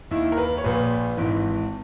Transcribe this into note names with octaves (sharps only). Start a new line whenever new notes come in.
D#2 D#3 E4
A#4
B4
C#5
A#1 A#2 B4
G#1 G#2 E3